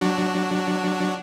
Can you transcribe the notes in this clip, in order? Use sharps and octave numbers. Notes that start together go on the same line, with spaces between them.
F#3 D4 F#4